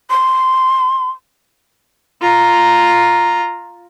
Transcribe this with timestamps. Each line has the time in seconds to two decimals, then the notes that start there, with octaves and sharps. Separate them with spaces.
0.10 C6
2.22 F4 A#5